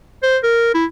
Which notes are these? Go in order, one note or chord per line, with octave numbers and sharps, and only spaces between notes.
C5
A#4
E4